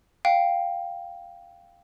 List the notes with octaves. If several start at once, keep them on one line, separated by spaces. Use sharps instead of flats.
F5 G5